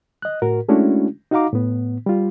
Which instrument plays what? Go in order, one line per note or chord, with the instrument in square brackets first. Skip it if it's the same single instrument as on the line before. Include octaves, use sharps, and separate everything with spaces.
[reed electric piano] D#5 F#6
A2 F#4 A#4
G#3 A3 C#4 D4 E4 F#4
D#4 F#4 D#5 F5 A#5 D6
A2 B3
G3 F4